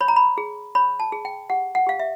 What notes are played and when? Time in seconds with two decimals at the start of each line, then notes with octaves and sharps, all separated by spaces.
0.01 C#5 B5
0.08 A#5
0.16 B5
0.38 G#4
0.75 C#5 B5
1.00 A5
1.12 G#4
1.25 G5
1.50 G4 F#5
1.75 F#5
1.87 G4 F5
1.99 E5